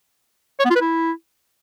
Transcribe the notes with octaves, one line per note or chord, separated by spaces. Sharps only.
C#5
B3
F4
B4
E4